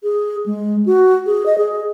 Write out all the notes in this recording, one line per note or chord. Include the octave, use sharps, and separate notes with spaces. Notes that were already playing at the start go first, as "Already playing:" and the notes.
G#4
G#3
F#4
G#4
D#5
G#4